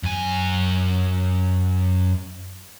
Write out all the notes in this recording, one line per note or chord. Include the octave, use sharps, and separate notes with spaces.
F#2 G#5